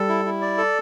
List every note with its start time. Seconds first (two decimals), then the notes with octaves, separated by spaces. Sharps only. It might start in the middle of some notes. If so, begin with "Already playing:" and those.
Already playing: G3 A4
0.08 E4
0.25 E4
0.41 D5
0.57 A4